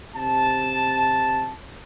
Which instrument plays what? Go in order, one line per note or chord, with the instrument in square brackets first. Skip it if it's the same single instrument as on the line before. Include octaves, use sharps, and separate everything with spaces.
[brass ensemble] C3 A5